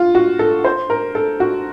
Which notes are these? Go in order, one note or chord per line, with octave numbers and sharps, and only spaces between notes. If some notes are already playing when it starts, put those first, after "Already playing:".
Already playing: F4
F#4
A4
C5
A#4
A4
F#4